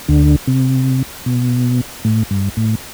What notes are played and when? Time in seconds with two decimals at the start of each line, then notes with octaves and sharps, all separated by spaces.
0.08 D2 D3
0.47 C3
1.26 B2
2.05 A2
2.31 G2
2.57 A2